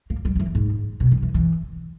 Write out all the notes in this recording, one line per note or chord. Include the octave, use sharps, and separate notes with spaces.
A#3
G3
G3
E3
G#2
B2
D#3
E3
E3